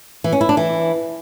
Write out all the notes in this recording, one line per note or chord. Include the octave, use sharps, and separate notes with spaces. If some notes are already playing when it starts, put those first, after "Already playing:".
E3
C#4
E4
D4
E3